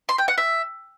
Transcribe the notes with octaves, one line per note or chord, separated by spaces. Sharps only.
C6
G5
F#5
E5